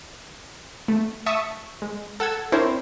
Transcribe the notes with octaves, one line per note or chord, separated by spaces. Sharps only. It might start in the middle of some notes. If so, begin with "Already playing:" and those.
A3
E5 A5 C#6 D#6 E6
G#3
A4 F#5 E6 G#6
C4 D4 E4 A#4 C5 C#5